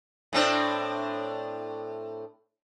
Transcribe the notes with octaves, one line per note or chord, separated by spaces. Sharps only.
A2 C4 D4